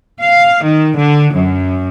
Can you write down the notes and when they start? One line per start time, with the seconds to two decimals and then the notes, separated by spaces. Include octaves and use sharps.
0.21 F5
0.64 D#3
0.97 D3
1.34 F#2